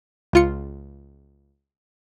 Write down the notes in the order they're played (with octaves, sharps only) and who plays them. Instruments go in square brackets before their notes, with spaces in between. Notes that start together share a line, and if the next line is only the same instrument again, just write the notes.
[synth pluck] C#2 F4 C#7